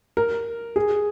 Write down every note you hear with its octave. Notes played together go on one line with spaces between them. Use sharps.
A#4
G#4